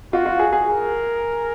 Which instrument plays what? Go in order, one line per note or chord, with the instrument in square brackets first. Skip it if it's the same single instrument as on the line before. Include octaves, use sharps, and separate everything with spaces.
[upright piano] F4 [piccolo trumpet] F#4
[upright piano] F4
G#4
G#4
[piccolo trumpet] A#4